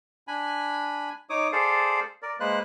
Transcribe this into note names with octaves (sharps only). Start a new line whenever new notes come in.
D4 G#5 B5
D#4 C#5 D6 D#6
G#4 A4 C5 D5 F5
A#4 D5
G#3 A#3 B4 C5 F#6